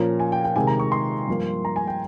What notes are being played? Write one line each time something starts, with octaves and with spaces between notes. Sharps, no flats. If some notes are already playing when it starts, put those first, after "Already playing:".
Already playing: A#2 F3 A#3 C#4 A#5
G#5
G5
G5
C3 D#3 G#3 G#5
A#5
C#6
C6
G2 F3 A#3
A#5
G#5
G5